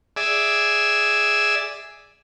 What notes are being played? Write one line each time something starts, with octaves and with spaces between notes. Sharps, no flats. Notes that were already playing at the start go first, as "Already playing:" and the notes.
G#4 D5 E5